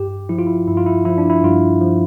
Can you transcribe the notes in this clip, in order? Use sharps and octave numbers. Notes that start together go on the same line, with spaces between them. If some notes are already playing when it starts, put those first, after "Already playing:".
Already playing: G2 G4
F3 E4
F4
E4
G2 E4
F4
E4
F3 E4
D4
E4
G2 F4
F3